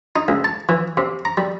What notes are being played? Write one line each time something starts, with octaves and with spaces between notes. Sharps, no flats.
D#4
C#2
A5
E3
C3
A#5
G3